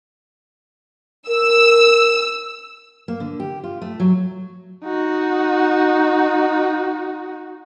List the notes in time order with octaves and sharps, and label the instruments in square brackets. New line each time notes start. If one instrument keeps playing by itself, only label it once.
[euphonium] A#4 [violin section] E6
[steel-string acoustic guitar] A#3
D3
G4
F4
A3
F#3
[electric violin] D#4 F#4